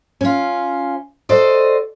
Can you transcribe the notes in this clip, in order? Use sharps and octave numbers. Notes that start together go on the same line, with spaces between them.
C#4 F4
F#4 A4 C5 D5 D#5